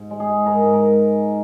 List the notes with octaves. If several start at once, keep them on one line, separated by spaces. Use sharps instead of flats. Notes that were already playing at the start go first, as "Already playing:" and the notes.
Already playing: G#2
G#3
G#4
G#3
G#2 A#4
G#2
A#4